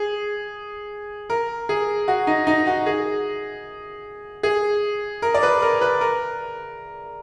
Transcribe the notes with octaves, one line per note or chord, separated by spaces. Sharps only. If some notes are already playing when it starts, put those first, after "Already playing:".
Already playing: G#4
A#4
G#4
F#4
D#4
D#4
F#4
G#4
G#4
A#4
D5
B4
A#4
B4
A#4